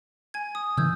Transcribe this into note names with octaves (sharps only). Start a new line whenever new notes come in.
G#5 G#6
D#6
C#3 E3 C#4 E6 G6 G#6